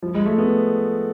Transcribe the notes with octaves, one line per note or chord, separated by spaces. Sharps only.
F3
G#3
A3
B3